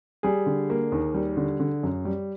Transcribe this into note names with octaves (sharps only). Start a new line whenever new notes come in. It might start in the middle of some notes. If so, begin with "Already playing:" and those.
G3 G#4
D3
A#3
D#2
G3
D3
D3
F#2
G3